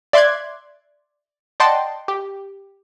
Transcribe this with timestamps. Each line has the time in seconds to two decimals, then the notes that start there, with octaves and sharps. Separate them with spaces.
0.13 D5 E5 C6 D6 F#6 G#6
1.60 D5 D#5 F#5 G5 A5 C6
2.08 G4